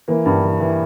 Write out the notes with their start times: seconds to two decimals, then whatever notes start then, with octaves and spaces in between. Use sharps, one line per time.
0.08 E3 A#3
0.26 G2
0.43 E3
0.60 E3